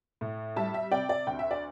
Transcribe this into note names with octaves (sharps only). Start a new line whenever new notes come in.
A2
G3 E5 A5
E5
C3 D5 G5
D5
D2 G5
E5
D5